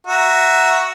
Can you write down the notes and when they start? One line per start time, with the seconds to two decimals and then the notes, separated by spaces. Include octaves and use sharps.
0.07 F#4 E5 A#5